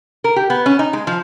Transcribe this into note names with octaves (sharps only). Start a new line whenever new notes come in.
A#4
G4
B3
C#4
D#4
G#3
F3